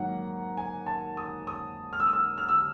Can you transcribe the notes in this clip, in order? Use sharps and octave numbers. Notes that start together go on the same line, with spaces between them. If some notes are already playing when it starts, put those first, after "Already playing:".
Already playing: G#2 D#3 F#3 A#3 F#5
G#5
A5
D#6
D#6
F6
E6
D#6
E6
F6
E6